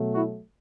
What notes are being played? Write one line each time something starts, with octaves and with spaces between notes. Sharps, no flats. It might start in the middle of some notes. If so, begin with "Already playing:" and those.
Already playing: B2 F#3 A3
E4 F#4